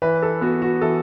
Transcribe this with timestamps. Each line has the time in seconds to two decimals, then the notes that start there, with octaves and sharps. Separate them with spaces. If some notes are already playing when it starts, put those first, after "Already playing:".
0.02 E3 B4
0.22 A4
0.41 B3 F#4
0.62 F#4
0.81 E3 A4